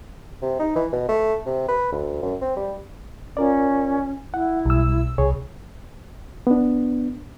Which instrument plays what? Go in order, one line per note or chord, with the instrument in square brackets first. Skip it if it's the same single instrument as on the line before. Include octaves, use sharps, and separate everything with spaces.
[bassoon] C3
D#4
E3
B2
A3
C3
B4
D2
F#2
C4
G3
[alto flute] C#4 [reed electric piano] F4 A#4 D5
[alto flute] E4 [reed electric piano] F#5
[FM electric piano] B1 E6 [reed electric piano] G3
[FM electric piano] C2 [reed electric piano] G#4 C#5
[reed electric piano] B3 D4